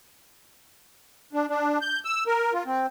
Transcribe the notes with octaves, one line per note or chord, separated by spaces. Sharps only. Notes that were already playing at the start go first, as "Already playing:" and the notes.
D4
D4
G6
E6
A#4
F4
C4